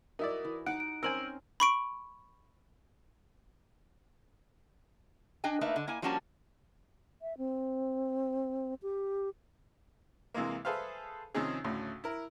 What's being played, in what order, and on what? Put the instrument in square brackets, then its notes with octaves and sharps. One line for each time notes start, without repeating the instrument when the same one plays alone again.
[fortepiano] D#4 E4 D5 [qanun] F#4 [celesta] A#4
[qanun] E3
[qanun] D#4 A#5 D6 [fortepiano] F#5 [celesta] D7
[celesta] D7
[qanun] C4 C#4 [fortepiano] A#4 C5 G#5 [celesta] E6 D7 F#7
[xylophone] B5 C#6 D7
[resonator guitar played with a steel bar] D4 D#5 G5 G#5
A3 A#3 D#4 B4 E5
D3
A#3 E4 G#5
F3 G3 A#3 C#4 F#4 A5
[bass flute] E5
C4
G4
[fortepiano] C3 E3 G#3 A#3
G#4 A4 B4 C5 E5 F5
C3 D#3 F3 C#4 D#4 G#4
D2 A2 C#3
E4 A#4